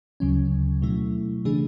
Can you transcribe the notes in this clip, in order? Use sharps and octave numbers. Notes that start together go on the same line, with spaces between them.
D2 C#3 F#3 C#4
B2 F#3 A3 E4
C#3 E3 A3 D4 G#4